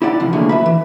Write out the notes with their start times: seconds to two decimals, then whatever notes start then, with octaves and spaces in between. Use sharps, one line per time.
0.02 E4 G4 D5 F#5
0.20 C3 E3 F3
0.33 A#2 D3 F3 F#3 A3 G#4
0.49 B4 E5 B5
0.66 E3